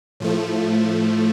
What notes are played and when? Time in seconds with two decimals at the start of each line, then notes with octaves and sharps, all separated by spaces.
0.20 A2 F3 A3